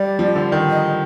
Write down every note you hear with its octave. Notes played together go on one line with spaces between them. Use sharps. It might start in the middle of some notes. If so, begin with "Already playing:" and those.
Already playing: G3 D5
F3
D3
D#3
D#5